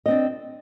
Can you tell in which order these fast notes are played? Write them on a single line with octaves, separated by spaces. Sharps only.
D#5 C4 D4